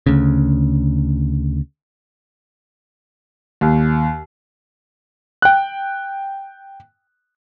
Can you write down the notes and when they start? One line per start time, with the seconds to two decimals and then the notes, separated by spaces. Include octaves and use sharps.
0.06 D2 C#3
3.61 D#2
5.42 G5 F#6